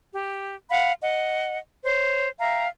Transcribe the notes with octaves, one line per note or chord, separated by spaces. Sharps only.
G4
F5 F#5 B5
D#5 F#5
C5 C#5
E5 F5 G5 A#5